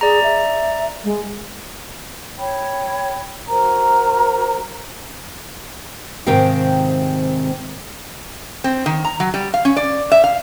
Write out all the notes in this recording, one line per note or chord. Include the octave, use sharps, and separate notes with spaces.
G#4 D5 A#5
E5
G#3
C#5 G5 B5
F#4 A#4 C5 A#5
G#2 C3 D#3 C4 F5 G5
C4
D#3
A#5
F#3
G3
F5
C#4
D5
E5
F5